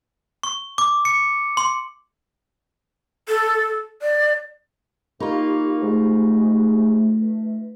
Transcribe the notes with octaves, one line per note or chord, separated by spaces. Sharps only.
C#6
D6
C#7
C6
A4
D5
A#3 D#4 F4 G4 B5 C#6
G#2 A3
B4